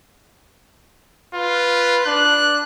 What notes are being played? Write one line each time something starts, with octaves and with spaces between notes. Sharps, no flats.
F4 B4
D4 F#6